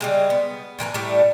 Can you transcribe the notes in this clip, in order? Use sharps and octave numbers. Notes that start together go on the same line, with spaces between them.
C#3 G3 G#3
B3
A2 E3 A#4 B4
A2 G3 A3